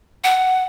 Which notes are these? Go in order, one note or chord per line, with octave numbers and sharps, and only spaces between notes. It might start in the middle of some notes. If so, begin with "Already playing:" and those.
F#5